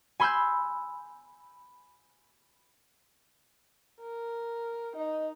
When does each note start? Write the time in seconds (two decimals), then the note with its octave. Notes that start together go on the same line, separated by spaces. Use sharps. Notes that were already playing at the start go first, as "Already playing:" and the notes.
0.20 G#5 B5 C6 E6 F#6 G6
4.01 A#4
4.96 D#4 D#5